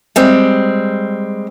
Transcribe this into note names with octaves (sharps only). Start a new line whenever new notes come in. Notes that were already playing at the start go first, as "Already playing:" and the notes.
G3 G#3 C4